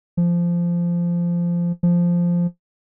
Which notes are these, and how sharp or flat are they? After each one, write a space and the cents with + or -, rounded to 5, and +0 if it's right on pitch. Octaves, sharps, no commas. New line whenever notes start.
F3 -15
F3 -5